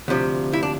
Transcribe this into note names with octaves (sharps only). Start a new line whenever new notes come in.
D2 C3 F3
E4
D4